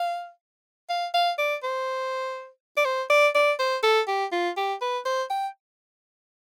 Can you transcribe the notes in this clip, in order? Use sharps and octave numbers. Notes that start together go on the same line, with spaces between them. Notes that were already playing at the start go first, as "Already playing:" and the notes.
Already playing: F5
F5
F5
D5
C5
D5
C5
D5
D5
C5
A4
G4
F4
G4
B4
C5
G5